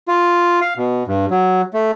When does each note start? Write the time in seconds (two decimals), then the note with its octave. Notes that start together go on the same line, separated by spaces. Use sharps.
0.08 F4
0.61 F5
0.77 B2
1.08 G2
1.31 F#3
1.74 A3